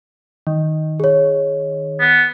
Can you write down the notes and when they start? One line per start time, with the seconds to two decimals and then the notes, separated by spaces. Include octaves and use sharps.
0.47 D#3
1.00 G#4 C#5
2.00 B3